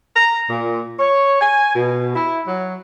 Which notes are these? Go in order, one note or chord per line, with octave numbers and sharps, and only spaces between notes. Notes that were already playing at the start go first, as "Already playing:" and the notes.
A#5
A#2
C#5
G#5
B2
E4
F#3